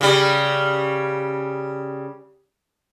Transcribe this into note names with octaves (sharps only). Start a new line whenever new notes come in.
C#3 G3